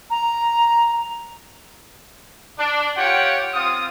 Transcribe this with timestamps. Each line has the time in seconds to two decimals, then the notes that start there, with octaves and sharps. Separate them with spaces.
0.10 A#5
2.58 D4
2.96 F4 G4 C#5 F#5 G5
3.54 C4 F4 D#6